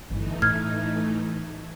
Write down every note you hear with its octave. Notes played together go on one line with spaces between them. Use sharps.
G1 E3 A3 D#4
A2 F6 G#6